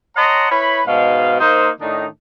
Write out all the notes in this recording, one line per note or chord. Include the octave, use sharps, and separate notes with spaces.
C#5 D#5 F#5 A5 A#5 C6
E4 B4 C#5 B5
G#2 B2 F5
A#3 D#4 C5
A2 D#3 D4 D#4